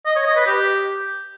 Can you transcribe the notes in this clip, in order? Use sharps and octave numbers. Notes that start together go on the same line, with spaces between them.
D#5
C#5
D#5
B4
G4